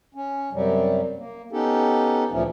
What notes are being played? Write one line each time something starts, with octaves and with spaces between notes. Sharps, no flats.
C#4
F#2 C3 F#3 G3
A#3
B3 C#4 D#4 G4 A4
D2 A#2 E3 F3 A3 C#4